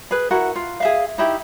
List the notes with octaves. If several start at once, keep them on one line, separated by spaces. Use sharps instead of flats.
G#4 B4
E4 F#4 A#4 F#5
F4
G#4 E5 F5
D#4 E4 G4